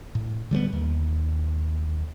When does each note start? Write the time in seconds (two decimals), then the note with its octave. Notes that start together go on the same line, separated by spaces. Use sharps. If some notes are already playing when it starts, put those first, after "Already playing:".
0.15 A2
0.51 D3 G3 G#3 B3
0.73 D#2